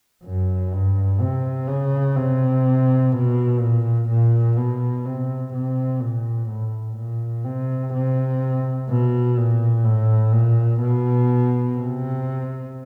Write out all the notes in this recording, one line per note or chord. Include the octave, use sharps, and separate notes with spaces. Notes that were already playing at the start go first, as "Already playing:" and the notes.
F#2
G2
C3
C#3
C3
B2
A#2
A#2
B2
C3
C3
A#2
A2
A#2
C3
C3
B2
A#2
A2
A#2
B2
C3